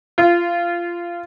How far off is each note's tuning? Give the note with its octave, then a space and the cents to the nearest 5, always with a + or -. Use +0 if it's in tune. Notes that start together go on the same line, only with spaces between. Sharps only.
F4 -20